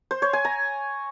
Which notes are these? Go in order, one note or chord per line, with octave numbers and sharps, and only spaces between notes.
C5
C#5
G#5
A#5